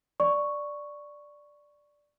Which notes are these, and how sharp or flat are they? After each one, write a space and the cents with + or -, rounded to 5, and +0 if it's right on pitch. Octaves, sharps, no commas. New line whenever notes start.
D5 +0 C#6 +0